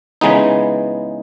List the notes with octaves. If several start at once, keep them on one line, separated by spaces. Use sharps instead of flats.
C#3 E3 G#3 B3 D#4